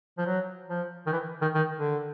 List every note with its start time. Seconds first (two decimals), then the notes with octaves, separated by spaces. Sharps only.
0.18 F3
0.26 F#3
0.69 F3
1.06 D#3
1.12 E3
1.41 D#3
1.55 D#3
1.77 D3